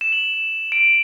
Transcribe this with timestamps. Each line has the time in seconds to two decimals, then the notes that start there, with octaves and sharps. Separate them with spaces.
0.01 E7
0.12 F#7
0.72 D7